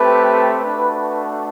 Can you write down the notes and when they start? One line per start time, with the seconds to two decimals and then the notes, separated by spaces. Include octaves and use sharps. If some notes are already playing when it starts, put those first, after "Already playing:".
Already playing: A3 C4 G4 B4
0.62 A3 D4 F#4 B4
0.92 B4